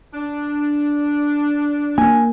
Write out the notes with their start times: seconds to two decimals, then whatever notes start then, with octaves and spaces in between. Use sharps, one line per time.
0.14 D4
1.98 A#3 G#5